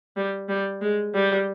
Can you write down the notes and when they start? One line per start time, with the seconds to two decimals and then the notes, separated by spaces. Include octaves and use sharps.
0.16 G3
0.49 G3
0.82 G#3
1.14 G3